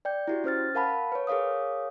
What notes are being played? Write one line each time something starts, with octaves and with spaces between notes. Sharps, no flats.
D5 G5 G6
E4 F#4 G4
C#4 C5 F6 A6
A#4 F5 F#5 A5 B5
B4 C#5
G#4 A#4 C#5 F5 D#6